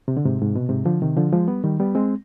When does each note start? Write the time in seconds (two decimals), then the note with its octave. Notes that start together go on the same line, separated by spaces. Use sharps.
0.08 C3
0.17 D3
0.25 G#2 C3
0.42 G#2
0.56 B2
0.69 G#2 C3
0.85 D3 F3
1.02 C3 D#3
1.17 D3 F3
1.32 F3 G#3
1.48 G3 B3
1.64 D#3 G3
1.80 G3 B3
1.95 G#3 C4